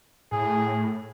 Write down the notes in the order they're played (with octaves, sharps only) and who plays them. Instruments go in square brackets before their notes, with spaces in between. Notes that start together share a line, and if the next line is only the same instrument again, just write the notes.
[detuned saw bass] A2 [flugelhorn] G#4